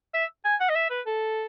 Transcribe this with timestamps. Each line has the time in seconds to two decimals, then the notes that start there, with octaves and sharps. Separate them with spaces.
0.14 E5
0.45 G#5
0.60 F#5
0.70 D#5
0.76 E5
0.90 B4
1.06 A4